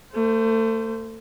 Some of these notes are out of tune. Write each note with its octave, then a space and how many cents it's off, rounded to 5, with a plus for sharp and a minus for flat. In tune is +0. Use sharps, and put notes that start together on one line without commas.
A3 +30 C5 -20